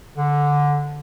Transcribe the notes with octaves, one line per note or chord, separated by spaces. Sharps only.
D3